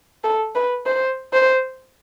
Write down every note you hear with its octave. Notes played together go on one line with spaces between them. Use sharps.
A4
B4
C5
C5